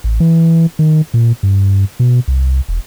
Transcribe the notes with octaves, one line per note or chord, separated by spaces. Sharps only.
A1
E3
D#3
A#2
G2
B2
C2
E1